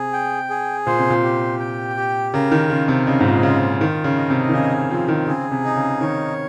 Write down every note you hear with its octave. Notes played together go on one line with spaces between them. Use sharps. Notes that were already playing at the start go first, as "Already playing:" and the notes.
Already playing: C3 G#4
G5
G#4
A#2 C5
C3
A#2
G4
G5
G4
C#3 A#4
D#3
C#3 F4
C3
C#3 D#5
G#2
A#2
C#3 F4
D#3 F4
C#3
D#5
C3
D#3
C#3 G#4
F3 C4
D#3
C#3 G#4
C3
D#4
C#3
D#3 C#5